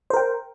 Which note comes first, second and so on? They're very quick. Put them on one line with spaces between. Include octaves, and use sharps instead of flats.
C5 A#4 G5